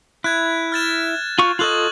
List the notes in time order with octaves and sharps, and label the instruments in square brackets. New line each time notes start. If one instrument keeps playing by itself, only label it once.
[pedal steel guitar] E4 [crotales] F#6 G#6
[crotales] F6 A6 E7
[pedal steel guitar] F4 C#6
[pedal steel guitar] F4 A4 D#5 [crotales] C#6 F#6 F#7